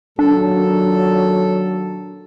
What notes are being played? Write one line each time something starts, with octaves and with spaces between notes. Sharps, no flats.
A#2 D#3 F#3 D4 A4